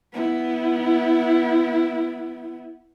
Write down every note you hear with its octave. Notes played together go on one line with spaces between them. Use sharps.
B3 E4